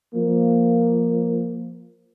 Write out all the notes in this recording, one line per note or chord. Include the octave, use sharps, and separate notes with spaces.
F3 A#3